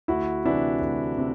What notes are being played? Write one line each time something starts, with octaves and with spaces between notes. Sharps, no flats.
D2 E4 F#4
C3 E3 D4 E4
D2
C3